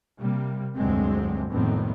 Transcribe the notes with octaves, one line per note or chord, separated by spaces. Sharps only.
C3 G3 A#3
F1 D2 G2 F#3 G#3 C4
C2 F2 A2 D#3 B3 C4